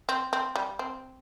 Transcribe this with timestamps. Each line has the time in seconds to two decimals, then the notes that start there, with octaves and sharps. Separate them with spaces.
0.09 C4
0.33 C4
0.56 G3
0.79 C4